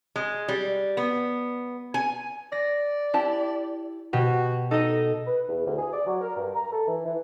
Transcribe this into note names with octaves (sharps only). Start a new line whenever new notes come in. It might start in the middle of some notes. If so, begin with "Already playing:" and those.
G#3
G3
B3
G#5
D5 A#6
E4 G4 A5
B2 F#4 G4
D#4 A4 D#5
B4
E2
D2
G#4
D5
F#3
A#4
G2
A#5
A4
E3
E3